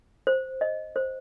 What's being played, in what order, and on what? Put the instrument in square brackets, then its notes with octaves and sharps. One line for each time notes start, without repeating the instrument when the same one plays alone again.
[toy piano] C5
D#5
C5